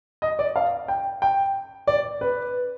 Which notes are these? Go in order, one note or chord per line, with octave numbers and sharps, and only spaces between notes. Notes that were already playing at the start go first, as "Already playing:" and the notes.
D#5
D5
F5
G5
G5
D5
B4